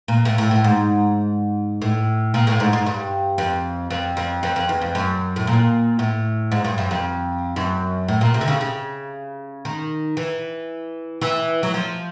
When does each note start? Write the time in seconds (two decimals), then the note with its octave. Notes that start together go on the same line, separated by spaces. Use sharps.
0.08 A#2
0.25 A2
0.38 A2
0.51 A2
0.64 G#2
1.82 A2
2.34 A#2
2.47 A2
2.60 G#2
2.73 G#2
2.86 G2
3.38 F2
3.90 F2
4.17 F2
4.43 F2
4.56 F2
4.69 E2
4.82 F2
4.95 F#2
5.36 A2
5.47 A#2
5.99 A2
6.52 G#2
6.64 G2
6.78 F#2
6.91 F2
7.56 F#2
8.08 A2
8.21 A#2
8.34 C3
8.41 D3
8.48 C#3
8.61 C#3
9.65 D#3
10.17 E3
11.21 E3
11.63 F#3
11.74 F3